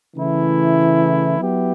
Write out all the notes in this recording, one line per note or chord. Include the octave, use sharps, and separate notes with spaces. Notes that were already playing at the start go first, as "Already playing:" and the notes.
C#3 E3 A3 E4
F#3 B3 E4 G4